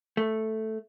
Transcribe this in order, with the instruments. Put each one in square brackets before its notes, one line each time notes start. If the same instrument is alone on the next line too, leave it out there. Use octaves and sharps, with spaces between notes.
[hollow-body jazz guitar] A3